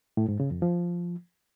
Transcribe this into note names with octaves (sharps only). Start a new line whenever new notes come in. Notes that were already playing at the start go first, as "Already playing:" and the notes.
A2
G#2
C#3
F2
F3